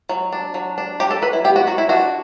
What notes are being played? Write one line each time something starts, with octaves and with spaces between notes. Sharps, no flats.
F#3
D4
F#3
D4
F#3 G4
A4
F#3 B4
E4
B3 G4
F#4
F#3 F#4
E4
D4 F#4